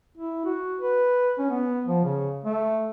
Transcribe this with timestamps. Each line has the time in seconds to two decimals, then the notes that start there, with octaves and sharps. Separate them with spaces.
0.18 E4
0.45 F#4
0.81 B4
1.39 C#4
1.51 B3
1.87 F3
2.04 C#3
2.45 A3